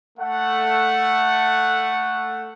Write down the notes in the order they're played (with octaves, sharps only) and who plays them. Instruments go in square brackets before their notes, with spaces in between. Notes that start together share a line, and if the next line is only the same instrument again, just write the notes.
[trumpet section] A3 F#5